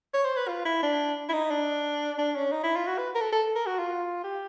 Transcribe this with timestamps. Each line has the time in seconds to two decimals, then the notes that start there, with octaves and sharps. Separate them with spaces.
0.14 C#5
0.25 C5
0.37 B4
0.48 F4
0.65 E4
0.83 D4
1.29 E4
1.33 D#4
1.51 D4
2.18 D4
2.35 C#4
2.52 D#4
2.63 E4
2.76 F4
2.87 F#4
2.98 B4
3.15 A#4
3.21 A4
3.32 A4
3.55 A#4
3.66 F#4
3.78 F4
4.24 G4